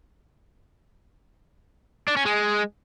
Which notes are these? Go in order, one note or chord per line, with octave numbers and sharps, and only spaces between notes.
D4
C#4
G#3